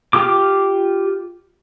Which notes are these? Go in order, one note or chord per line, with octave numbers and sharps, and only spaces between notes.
F4 G4 D6